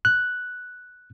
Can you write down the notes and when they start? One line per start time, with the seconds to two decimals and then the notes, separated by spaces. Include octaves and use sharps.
0.05 F#6